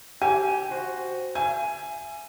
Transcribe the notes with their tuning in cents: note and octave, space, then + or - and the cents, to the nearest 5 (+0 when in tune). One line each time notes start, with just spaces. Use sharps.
G4 -25 G#5 +0
F#4 +0 C5 +0
E5 +45 G#5 +0